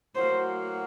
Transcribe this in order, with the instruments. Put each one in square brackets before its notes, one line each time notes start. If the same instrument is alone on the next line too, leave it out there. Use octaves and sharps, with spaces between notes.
[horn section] A2 F#3 A#3 F#4 [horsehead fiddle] C5